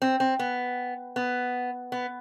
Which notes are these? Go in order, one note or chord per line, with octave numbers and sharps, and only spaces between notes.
C4
C4
B3
B3
B3